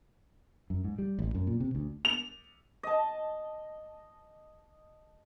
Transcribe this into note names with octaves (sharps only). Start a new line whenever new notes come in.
F#2
G#2
G3
A1
F#2
A#2
C3
D2
F7
D#5 A5